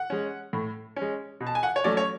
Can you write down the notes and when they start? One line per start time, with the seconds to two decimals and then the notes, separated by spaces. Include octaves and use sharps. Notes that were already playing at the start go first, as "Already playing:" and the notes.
Already playing: F#5
0.10 G#3 C#4
0.53 A2
0.96 C#4
1.02 G#3
1.40 B2
1.47 A5
1.55 G#5
1.63 F#5
1.76 C#5
1.84 F#3 A3 C#4 D5
1.97 C#5